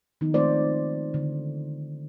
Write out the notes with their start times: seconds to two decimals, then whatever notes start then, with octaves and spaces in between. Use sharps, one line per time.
0.21 D#3 F3 B3 D#4
0.34 G#3 A3 C4 F4 C5 D5
1.14 D3